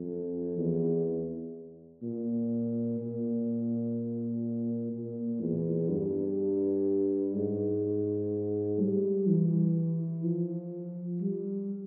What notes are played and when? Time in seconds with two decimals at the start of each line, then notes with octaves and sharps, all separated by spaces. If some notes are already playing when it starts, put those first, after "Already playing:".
Already playing: F2
0.58 E2
2.03 A#2
2.99 A#2
4.93 A#2
5.41 E2
5.89 G2
7.35 G#2
8.80 G3
9.27 E3
10.24 F3
11.21 G3